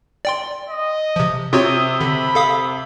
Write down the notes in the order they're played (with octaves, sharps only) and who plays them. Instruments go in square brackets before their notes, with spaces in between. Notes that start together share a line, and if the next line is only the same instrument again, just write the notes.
[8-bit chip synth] D5 G5 C6
[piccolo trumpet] D#5
[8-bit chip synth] C3 F3
[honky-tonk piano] C3 [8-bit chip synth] F4 F#4 C#5 [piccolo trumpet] D#6
[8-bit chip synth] D3 [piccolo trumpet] B5
[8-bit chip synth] A4 F5 D#6